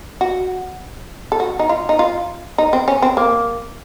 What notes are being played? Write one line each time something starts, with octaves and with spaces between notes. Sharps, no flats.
F#4
A4
F#4
D#4
F4
D#4
F4
D#4
C4
C#4
C4
A#3